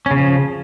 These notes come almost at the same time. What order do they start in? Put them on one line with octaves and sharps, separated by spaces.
C#4 C#3 F3